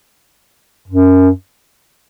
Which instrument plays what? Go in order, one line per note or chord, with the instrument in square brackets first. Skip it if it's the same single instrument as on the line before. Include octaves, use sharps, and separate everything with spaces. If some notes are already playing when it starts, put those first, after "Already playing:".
[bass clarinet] F#2